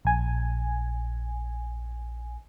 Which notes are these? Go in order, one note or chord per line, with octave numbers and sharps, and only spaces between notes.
A#1 G#5